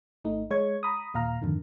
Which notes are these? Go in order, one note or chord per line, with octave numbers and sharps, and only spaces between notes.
G#1 A3 D#4
G#3 C#5 C#6 G#6
A#5 B5 D#6
D#2 A#2 F5 A#5 F6
F2 G#2 D3 D#3